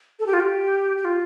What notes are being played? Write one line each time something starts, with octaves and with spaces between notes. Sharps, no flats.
A4
G4
F4
G4
G4
F4